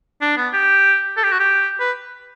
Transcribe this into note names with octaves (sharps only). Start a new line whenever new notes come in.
D4
B3
G4
A4
G4
F#4
G4
B4